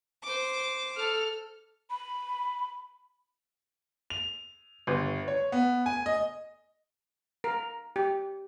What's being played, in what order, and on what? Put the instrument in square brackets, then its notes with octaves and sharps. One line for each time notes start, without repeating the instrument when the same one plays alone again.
[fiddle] C5 D6
[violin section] A4 F6
[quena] B5
[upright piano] F7
G1
C#5
B3
G#5
D#5
[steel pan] A#4
G4